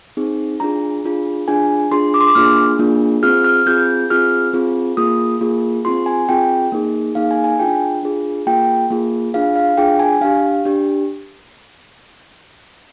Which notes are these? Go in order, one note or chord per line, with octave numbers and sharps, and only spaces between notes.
C4 D#4 G#4
D4 F4 G#4 A#5
D4 F4 G#4
D4 F4 G#4 G#5
D4 F4 G#4 C6
D6
C6
D6
A#3 D4 F4 G#4 F6
A#3 D4 F4 G#4
C4 F4 G#4 F6
F6
C4 F4 G#4 G6
C4 F4 G#4 F6
C4 F4 G#4
A#3 F4 G#4 D#6
A#3 F4 G#4
C4 F4 G#4 C6
G#5
C4 F4 G#4 G5
A#3 D#4 G#4
A#3 D#4 G#4 F5
G#5
G#5
D4 F4 G#4 G5
D4 F4 G#4
A#3 F4 G#4 G5
A#3 F4 G#4
D4 F4 G#4 F5
F5
D4 F4 G#4 G5
G#5
D4 G4 F5
D4 G4